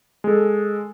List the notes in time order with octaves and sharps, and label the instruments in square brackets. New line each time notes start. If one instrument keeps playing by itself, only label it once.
[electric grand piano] G#3 A4